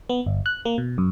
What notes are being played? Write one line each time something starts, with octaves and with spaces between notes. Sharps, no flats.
B3
G1
F#6
A#3
B2
F#2